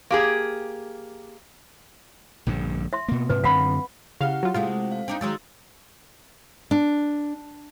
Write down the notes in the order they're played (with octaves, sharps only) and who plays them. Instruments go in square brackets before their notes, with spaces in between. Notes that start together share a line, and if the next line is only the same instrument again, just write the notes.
[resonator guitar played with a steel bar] A#3 G4 G#4
[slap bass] A#1 G2 D3
[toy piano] E5 C6
[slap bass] B2 A#3
[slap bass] G#2 C3 [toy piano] B4
[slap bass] F#2 D3 C4 [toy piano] F5 F#5 B5
[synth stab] C#3 F5 [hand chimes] E4 G4 F#5
[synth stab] F#3 F4
[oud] C3 G#3 A3 [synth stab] F4
[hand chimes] F5
[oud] C4 D4 D#4
[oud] D#3 F#3 G#3 [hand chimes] C6 E6 A6
[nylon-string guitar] D4